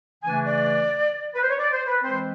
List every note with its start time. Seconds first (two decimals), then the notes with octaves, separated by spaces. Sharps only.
0.24 C#3 E3 A3 D4 G#5
0.46 D5
1.35 B4
1.42 C5
1.50 C#5
1.58 D5
1.72 C5
1.88 B4
2.03 E3 G#3 C4 C5